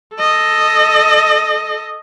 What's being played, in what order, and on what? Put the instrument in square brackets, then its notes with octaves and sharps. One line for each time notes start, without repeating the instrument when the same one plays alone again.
[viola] A4 D#5